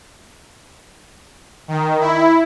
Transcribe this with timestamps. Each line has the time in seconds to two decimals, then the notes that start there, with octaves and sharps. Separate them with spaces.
1.68 D#3
2.00 E4